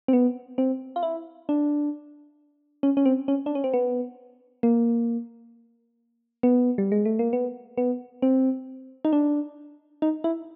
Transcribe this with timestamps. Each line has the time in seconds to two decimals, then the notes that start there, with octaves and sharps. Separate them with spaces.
0.08 C4
0.13 B3
0.58 C4
0.96 F4
1.03 E4
1.49 D4
2.83 C#4
2.97 C#4
3.06 C4
3.28 C#4
3.46 D4
3.55 C#4
3.64 C4
3.74 B3
4.63 A#3
6.43 B3
6.78 G3
6.92 G#3
7.06 A3
7.19 A#3
7.33 B3
7.78 B3
8.22 C4
9.05 D#4
9.13 D4
10.02 D#4
10.24 E4